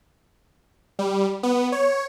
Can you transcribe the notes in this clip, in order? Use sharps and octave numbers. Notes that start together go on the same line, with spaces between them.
G3
B3
C#5